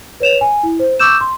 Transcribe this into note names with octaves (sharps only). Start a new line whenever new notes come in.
B4 C#5 E7 F7
G#5
E4
C5
C#6 D6 E6 G6 E7
C6